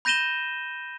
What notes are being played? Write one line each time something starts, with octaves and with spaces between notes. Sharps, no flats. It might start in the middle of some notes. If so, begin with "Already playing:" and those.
B5 G6 A#6 D#7 E7 G7